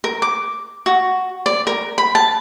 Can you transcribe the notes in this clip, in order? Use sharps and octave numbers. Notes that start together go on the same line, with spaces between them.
A#4
D6
F#4
D5
A#4
B5
A5